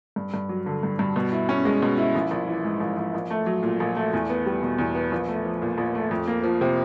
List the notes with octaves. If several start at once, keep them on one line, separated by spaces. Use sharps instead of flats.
G2
G2
F#3
D3
G2
G2
B2
E4
C#4
G#3
B2
E4
A#1
A#1
E3
G#2
A#1
A#1
A#1
A3
F#3
A#2
A#1
A3
E2
B3
G3
B2
E2
B3
A#1
A3
F3
A#2
A#1
A3
F2
A#3
F3
C3